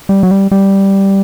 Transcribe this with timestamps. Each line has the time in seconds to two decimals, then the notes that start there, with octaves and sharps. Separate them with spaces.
0.09 G3
0.23 F#3
0.31 G3
0.51 G3